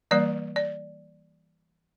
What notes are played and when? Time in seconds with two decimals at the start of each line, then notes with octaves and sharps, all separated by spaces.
0.11 E3 G3 A#3 D5
0.56 D5